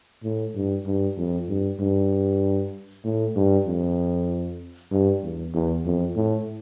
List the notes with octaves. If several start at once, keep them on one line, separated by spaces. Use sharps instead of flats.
A2
G2
G2
F2
G2
G2
A2
G2
F2
G2
E2
E2
F2
A2